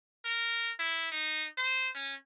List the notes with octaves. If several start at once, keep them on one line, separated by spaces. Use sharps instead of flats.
A#4
E4
D#4
C5
C#4